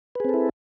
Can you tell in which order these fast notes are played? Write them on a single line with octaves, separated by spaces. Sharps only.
B4 G#4 C4 A4 E4